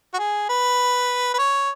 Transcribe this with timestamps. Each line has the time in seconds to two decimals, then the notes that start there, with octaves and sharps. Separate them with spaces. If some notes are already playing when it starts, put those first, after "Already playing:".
0.14 F#4
0.19 G#4
0.49 B4
1.34 B4
1.39 C#5